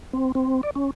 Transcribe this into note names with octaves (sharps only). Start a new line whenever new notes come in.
C4
C4
D5
C#4